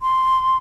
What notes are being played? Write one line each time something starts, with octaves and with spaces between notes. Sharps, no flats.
C6